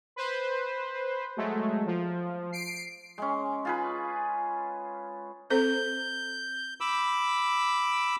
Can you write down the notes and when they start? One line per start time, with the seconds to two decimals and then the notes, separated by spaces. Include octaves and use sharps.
0.16 B4 C5
1.37 F#3 G#3 A3
1.86 F3
2.52 C7 D7
3.18 G#3 C#4
3.65 F4 G#4 B4
5.50 C4 A4 C5 G6
6.81 B5 D6 E6